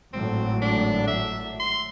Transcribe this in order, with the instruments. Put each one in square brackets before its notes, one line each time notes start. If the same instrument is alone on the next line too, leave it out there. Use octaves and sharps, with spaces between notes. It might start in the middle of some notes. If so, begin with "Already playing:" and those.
[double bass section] G#1 A2 F#3 [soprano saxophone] C4
[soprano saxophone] D4
E5
C6